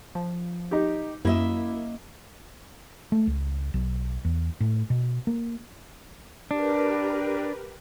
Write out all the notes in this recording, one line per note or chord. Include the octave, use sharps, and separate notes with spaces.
F3
D#4 G4
F#2 A#3 E4 D#5 E5
A3
C#2
B1
E2
A2
B2
A#3
D4 G4 A#4 B4